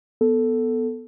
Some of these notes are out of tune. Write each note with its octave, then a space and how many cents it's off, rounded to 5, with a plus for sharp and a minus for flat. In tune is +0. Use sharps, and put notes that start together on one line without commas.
B3 +0 A4 +0